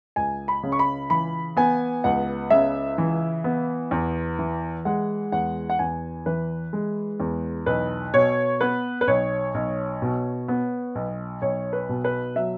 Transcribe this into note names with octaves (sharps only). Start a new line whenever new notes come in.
C#2 G#5
B5
C#3
C#6
B5
E3 B5
B3 G#5
C#2 F#5
C#3 E5
E3
B3
E2
E3
G#3 F#5
E2 F#5
F#5
E2 G#5
E3 B4
G#3
E2
B1 B4
B2 C#5
B3 B4
B4
B1 C#5
B1
B2
B3
B1
B1 C#5
B4
B2
B4
F#3 E5